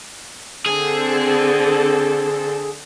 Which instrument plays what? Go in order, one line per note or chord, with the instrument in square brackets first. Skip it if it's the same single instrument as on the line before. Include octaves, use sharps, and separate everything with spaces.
[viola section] D3 C4 A4 [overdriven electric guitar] G#4